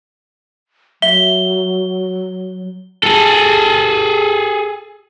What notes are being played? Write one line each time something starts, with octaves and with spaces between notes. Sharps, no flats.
F#3 E5 G7
G#4 A4